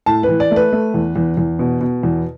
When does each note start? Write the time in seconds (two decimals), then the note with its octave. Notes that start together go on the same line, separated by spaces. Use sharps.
0.06 A2 A5
0.23 B4
0.29 E3
0.40 D5
0.51 A3
0.56 B4
0.72 A3
0.94 E2
1.16 E2
1.37 E2
1.59 B2
1.81 B2
2.03 E2